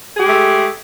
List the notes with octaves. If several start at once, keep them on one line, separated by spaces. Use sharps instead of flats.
G#3 A3 G4 G#4